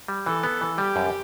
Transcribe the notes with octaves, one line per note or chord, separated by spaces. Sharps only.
G3
E3 A4
B3
E3
G3 G4
F#2